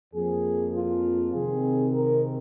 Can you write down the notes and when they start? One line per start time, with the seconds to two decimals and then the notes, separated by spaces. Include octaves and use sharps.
0.14 F2 F3 A#3 G#4
0.74 F4
1.33 C3 D#3 C4 G#4
1.93 A#4